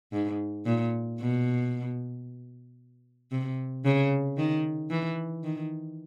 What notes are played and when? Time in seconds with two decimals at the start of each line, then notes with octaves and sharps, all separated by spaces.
0.13 G#2
0.66 A#2
1.19 B2
3.31 C3
3.85 C#3
4.37 D#3
4.91 E3
5.44 D#3